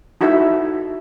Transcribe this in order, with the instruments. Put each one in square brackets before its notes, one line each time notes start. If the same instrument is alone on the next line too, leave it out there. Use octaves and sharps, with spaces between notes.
[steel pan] D#4 E4 F#4 A4 E5